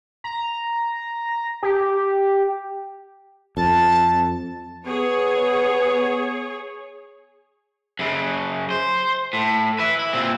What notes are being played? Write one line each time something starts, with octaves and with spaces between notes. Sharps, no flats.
A#5
G4
F2 A5
B3 G#4 C#5
F#2 C#3
C5
A2
B4 E5
E4
A#2 C4